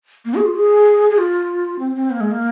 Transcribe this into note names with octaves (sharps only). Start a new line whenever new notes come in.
A#3
G#4
F4
G#4
G#4
F4
C4
C4
A#3
G#3
A#3